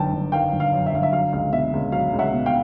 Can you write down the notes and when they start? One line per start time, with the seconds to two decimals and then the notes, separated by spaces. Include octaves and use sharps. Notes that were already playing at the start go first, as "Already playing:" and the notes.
Already playing: G1 F#2 D#3 G5 A5
0.13 G1
0.32 D#3 F5 G5
0.53 G1
0.60 F5
0.73 F#2
0.86 E5
0.93 G1 F5
1.03 E5
1.13 F#3 F5
1.33 C#2 F5
1.52 B2 E5
1.73 C#2
1.92 F#3 F5
2.13 C#2
2.19 E5 F#5
2.33 B2
2.46 F5 G5